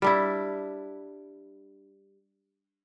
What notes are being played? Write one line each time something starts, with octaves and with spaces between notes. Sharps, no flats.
G3 D4 E4